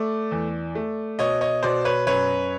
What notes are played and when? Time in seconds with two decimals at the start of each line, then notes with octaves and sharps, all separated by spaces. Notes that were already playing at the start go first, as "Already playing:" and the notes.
Already playing: A3 D5
0.31 E2
0.75 A3
1.19 B2 C#5 D#5
1.41 C#5 D#5
1.63 B2 C5 D5
1.85 B4 C#5
2.07 F#2 B4 C#5